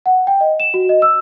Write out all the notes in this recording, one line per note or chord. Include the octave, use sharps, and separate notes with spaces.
F#5
G5
D#5
E7
F#4
D#5
E6